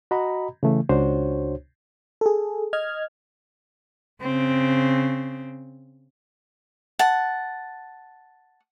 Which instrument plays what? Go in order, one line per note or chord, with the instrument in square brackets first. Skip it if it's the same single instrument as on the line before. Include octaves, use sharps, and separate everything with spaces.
[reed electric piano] F#4 D#5 A#5 B5
C#3 E3 A3
C#2 D4 F#4 C5 C#5
[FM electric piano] G#4 A4
D#5 F6 G#6
[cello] C#3 C4
[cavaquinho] F#5 A5